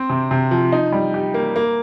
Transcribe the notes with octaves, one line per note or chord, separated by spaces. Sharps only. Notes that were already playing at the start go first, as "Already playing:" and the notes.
Already playing: C4
C3
C3
F3
D#4
G3
G4
A#3
A#3